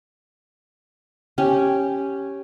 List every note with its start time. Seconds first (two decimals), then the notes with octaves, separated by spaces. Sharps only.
1.38 C#4 G4